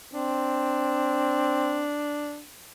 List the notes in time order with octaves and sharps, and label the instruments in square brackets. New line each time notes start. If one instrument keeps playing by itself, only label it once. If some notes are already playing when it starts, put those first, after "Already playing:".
[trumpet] C4 [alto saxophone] D4